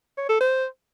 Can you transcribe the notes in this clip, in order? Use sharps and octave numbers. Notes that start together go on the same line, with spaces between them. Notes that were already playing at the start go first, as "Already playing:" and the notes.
C#5
A4
C5